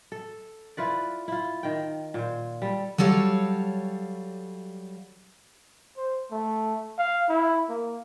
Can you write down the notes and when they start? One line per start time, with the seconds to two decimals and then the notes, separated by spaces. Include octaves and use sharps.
0.12 A4
0.77 E4 F4 B4 D5
1.28 E4 F4
1.63 D#3 G5
2.14 A#2 C5
2.62 G3 A4
2.98 F#3 G3 A4 C#5 F5
5.97 C5
6.32 A3
6.98 F5
7.29 E4
7.69 A#3